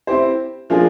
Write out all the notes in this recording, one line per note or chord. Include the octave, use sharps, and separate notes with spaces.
C4 E4 G4 C5
F3 A#3 D4 F4 G#4